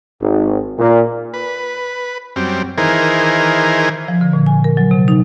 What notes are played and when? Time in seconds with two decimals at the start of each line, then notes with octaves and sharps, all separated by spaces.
0.22 G#1
0.79 A#2
1.34 B4
2.36 F#2 G3 C4
2.78 D#3 E3 G#4 A#4 C5
4.08 F3
4.21 D3
4.33 A#2
4.46 G#5
4.64 A#4
4.77 F#3
4.91 C3
5.08 D#4